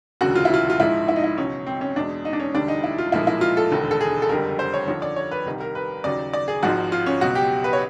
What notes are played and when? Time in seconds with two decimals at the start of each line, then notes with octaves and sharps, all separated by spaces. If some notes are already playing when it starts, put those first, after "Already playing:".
0.21 E1 D2 C#3 F#3 F#4
0.35 F4
0.45 E4
0.54 F4
0.70 F4
0.79 A#1 G#2 F3 G#3 E4
1.08 E4
1.16 D#4
1.24 E4
1.38 C#2 B2 F#3 C#4
1.67 C4
1.81 C#4
1.96 E2 B2 G#3 D4
2.25 D#4
2.33 D4
2.40 C#4
2.54 E1 D2 D3 G3 D4
2.68 D#4
2.84 E4
2.98 F4
3.12 B1 A#2 F3 G#3 E4
3.27 E4
3.41 F4
3.57 A4
3.71 E1 D#2 D3
3.91 A4
4.01 G#4
4.22 A4
4.29 F#1 F2 D3 G3 A#4
4.59 C5
4.74 C#5
4.87 D#2 D3 F3 C#5
5.02 D5
5.16 C#5
5.31 B4
5.46 C2 C3 D#3 G3
5.60 A#4
5.75 B4
6.04 D#2 C#3 F#3 D5
6.33 D5
6.48 G#4
6.63 G#1 G#2 F3 G#3 F#4
6.92 F4
7.06 C#4
7.21 C#2 B2 F#3 F#4
7.35 G4
7.64 B4
7.73 C#5